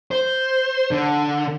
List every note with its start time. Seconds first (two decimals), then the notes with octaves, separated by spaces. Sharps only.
0.11 C5
0.91 D3